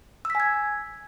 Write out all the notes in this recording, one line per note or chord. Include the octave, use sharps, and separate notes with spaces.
G#5 E6 G#6 B6